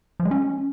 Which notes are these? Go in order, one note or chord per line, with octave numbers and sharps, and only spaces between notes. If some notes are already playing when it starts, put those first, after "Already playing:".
F3
G#3
C#4